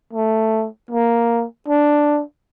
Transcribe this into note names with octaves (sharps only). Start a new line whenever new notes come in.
A3
A#3
D4